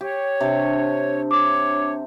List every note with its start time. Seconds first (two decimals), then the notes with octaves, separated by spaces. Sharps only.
0.01 G4 C#5
0.41 C3 D4 A5
1.31 C#5 D6